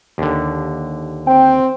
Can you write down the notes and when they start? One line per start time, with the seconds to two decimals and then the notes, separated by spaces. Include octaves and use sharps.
0.18 D#2 D3
1.27 C4 G5